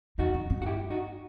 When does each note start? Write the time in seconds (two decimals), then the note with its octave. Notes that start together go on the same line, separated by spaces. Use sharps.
0.18 E2 D#4 F#4
0.34 F#2
0.50 G2
0.62 F#4
0.66 E4 G4
0.90 D#4 F#4